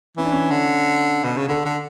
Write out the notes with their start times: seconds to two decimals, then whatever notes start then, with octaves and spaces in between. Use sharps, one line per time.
0.17 E3 C#4
0.25 D4
0.32 C#4
0.51 D3
1.24 B2
1.37 C#3
1.48 D3 A4
1.65 D3